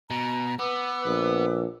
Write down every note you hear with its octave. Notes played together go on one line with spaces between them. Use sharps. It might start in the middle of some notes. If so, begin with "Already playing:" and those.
B2 A#5
B3 B4 D6 E6
A#1